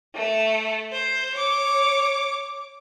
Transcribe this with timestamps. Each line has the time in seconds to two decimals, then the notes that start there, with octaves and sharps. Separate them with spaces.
0.15 A3
0.92 C5
1.35 C#5 D6